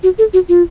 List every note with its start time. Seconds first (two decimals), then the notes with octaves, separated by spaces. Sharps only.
0.03 F#4
0.19 A4
0.34 F#4
0.49 F4